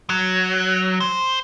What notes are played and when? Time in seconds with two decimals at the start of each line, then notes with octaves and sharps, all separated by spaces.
0.10 F#3
1.00 C5